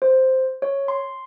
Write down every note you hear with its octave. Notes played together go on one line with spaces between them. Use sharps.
C5
C#5
C6